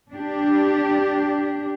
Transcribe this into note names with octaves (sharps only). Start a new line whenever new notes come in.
D4 G4